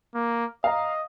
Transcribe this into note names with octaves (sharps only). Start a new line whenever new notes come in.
A#3
D#5 F5 A#5